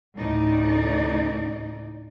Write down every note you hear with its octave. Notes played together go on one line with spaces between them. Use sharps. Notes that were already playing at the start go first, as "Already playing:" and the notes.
D2 A2 C#3 D#4 D5